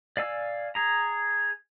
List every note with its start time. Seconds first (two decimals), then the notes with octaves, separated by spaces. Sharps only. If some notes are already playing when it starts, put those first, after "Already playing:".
0.17 D5 F5 G#5 E6
0.75 G#4 A#5